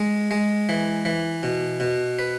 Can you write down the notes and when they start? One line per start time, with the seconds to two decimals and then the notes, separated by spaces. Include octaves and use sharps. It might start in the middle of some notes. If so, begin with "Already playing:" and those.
Already playing: G#3
0.31 G#3
0.69 E3
1.05 E3
1.43 B2
1.80 B2
2.19 B4